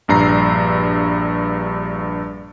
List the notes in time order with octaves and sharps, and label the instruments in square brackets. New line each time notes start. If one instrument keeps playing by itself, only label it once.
[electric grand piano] A#1 G2 A#5 C7